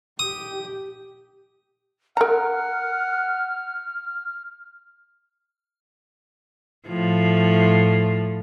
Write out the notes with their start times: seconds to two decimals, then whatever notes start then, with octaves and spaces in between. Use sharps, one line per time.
0.19 G4 D#6
2.17 A#4 F#5 A#5 F6
6.87 A2 F3